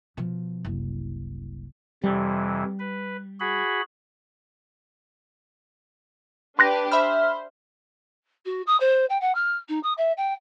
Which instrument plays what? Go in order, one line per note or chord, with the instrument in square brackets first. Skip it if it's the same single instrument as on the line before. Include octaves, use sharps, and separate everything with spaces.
[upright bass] B2 F3
F#1 C2
[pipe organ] F2 C3 E3 [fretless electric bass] G3
[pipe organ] B4
F#4 G#4 B5
[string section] D4 G4 B4 [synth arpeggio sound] C6 F#6 A#6
[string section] C5 [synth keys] E5 B5 F6
[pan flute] F#4
D#6
C5
G5
F#5
F6
D#4
D#6
E5
G5